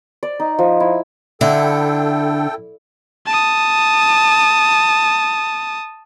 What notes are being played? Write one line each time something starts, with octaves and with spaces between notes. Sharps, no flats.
D5
D#4
F3
E4
D3 E4 A4 G5
A5 D#6